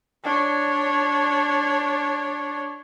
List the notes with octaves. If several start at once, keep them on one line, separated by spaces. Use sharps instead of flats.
D4 C#5